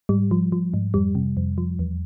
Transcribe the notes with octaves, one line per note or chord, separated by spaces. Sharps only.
G#2 G3
F3
F3
G#2
F2 G3
C3
F2
F3
E2